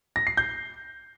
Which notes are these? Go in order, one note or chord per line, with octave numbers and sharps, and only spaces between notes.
A#6
C7
G6